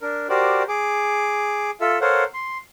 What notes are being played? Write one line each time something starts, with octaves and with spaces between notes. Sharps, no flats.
D4 A#4
F#4 G4 A#4 C5 D5
G#4 D6
F4 A4 E5
A4 A#4 C5 C#5 F5 F#5
C6